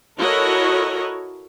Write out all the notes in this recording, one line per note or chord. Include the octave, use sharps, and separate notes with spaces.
E4 F#4 A4 A#4 C#5 D#5